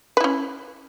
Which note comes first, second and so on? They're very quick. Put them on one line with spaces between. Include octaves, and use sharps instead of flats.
B4 E4 C#4